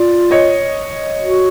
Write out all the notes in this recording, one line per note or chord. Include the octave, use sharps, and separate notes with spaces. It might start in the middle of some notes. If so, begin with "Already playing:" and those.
Already playing: F4 D5
C#5 D#5
F#4